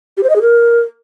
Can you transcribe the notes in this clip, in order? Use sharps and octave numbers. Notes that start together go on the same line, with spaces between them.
G4
C5
D#5
G#4
A#4